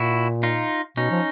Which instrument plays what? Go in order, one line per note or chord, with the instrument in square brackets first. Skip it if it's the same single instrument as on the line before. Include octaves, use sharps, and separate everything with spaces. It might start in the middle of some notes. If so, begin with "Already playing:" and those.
Already playing: [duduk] A#2 [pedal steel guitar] E4 F#4
[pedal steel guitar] D#4 F4
[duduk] B2 [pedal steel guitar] C#4 D#4
[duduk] F3